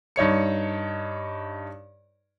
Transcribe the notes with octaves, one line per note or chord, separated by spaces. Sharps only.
G2 D#4 C#5 C#7